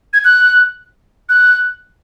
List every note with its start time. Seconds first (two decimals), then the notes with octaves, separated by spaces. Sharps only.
0.13 G#6
0.25 F#6
1.29 F#6